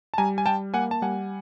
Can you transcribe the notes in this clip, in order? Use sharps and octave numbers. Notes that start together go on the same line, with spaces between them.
A5
G3 G#5 A#5
G#5
G3 G5 A5
A#3 F#5 G#5
A5
G3 F#5 G#5